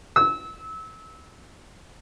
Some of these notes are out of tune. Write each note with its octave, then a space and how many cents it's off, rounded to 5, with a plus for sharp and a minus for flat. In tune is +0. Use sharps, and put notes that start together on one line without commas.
E6 -25